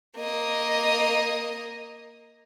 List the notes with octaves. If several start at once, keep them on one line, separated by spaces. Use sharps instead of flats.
A#3 D#5